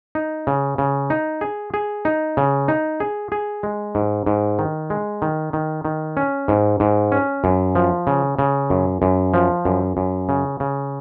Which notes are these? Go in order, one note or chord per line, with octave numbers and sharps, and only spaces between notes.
D#4
C#3
C#3
D#4
G#4
G#4
D#4
C#3
D#4
G#4
G#4
G#3
G#2
G#2
D#3
G#3
D#3
D#3
D#3
C#4
G#2
G#2
C#4
F#2
F3
C#3
C#3
F#2
F#2
F3
F#2
F#2
C#3
C#3